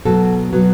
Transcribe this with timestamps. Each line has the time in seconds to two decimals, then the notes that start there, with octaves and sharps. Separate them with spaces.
0.05 B2 F#3 B3 A4
0.53 B2 F#3 B3